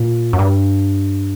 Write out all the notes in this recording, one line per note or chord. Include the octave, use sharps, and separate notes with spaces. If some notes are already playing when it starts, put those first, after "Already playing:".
Already playing: A#2
F#2
G2